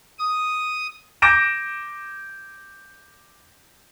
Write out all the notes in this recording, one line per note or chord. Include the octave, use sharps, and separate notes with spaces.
D#6
D6 G6 A#6 D7 E7